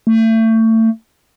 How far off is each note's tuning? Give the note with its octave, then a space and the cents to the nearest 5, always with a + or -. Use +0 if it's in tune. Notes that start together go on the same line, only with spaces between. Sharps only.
A3 +30